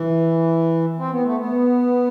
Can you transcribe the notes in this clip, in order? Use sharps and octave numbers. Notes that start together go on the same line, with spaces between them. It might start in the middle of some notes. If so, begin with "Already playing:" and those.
Already playing: E3
C4
B3
A3
B3